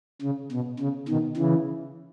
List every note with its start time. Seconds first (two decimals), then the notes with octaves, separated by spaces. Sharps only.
0.22 C#3
0.51 B2
0.79 C#3
1.08 B2 D#3
1.37 C#3 E3